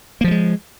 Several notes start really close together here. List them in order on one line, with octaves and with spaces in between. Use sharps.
A#3 F3 G3 G#3